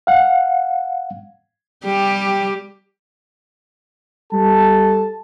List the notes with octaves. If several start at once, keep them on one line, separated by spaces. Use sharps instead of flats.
F5 F#5
G3 G4
G3 A4 A5